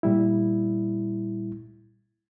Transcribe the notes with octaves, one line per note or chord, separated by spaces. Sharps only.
A#2 G3 E4